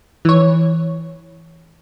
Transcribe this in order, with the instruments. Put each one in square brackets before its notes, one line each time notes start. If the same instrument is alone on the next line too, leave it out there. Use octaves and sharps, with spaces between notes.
[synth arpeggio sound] E3 C#5